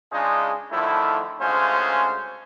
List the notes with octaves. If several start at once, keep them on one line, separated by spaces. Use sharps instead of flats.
C#3 G#3 D4 D#4 F4 G#4
D3 D#3 F3 A3 E4
D2 C#3 G#3 C#4 F4 C5